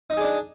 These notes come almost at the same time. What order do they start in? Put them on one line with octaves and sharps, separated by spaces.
D#4 D#5 G#4 D5 D4